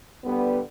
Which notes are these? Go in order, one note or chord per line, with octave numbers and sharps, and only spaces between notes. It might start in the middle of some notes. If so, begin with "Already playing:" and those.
D3 G3 B3